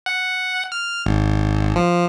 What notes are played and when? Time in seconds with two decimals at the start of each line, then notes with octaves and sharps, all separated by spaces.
0.06 F#5
0.72 F6
1.06 G#1
1.76 F3